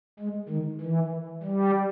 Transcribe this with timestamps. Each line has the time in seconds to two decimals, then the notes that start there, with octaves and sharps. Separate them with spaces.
0.19 G#3
0.49 D#3
0.81 E3
1.43 G3